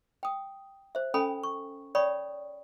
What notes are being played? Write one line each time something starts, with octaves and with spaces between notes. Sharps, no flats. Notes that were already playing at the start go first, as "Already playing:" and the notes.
G5 D#6
C5 E5
C#4 A4 G5 G#5 B5 D#6
C#6
C#5 D5 G5 B5 C#6 D#6